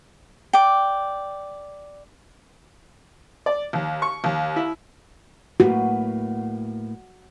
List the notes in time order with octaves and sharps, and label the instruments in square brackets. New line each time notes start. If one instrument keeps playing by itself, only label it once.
[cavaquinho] D5 G5
[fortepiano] D5
D#2
C#6
D#2
E4
[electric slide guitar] A2 A#3 B4 [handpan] F#4